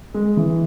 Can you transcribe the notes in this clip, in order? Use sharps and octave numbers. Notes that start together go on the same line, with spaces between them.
G#3
E3